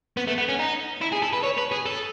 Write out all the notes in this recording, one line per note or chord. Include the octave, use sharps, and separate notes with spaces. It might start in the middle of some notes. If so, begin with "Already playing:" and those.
B3
A3
B3
C#4
D#4
E4
G#4
A4
B4
C#5
B4
G#4
A4